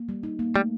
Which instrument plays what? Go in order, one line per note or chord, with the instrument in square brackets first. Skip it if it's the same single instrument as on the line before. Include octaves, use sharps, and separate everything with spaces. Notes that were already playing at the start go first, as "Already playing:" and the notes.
Already playing: [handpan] A#3
G3
D#4
A#3
[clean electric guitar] G3 [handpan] A3